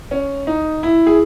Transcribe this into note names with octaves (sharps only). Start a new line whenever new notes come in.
C#4
D#4
E4
G#4